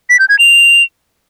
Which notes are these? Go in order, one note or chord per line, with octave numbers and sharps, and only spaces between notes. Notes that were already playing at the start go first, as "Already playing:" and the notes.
B6
G6
G#6
F7